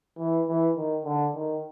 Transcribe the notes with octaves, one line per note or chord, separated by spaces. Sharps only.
E3
E3
D#3
D3
D#3